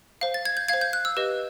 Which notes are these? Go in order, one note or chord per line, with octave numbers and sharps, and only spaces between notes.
C5 F5
A6
G#6
G6
C5 F5 G#6
G6
F#6
E6
G4 B4 D#5